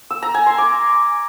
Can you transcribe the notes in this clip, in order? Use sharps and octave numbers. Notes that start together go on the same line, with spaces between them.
E6
A#5
G#5
C6
D6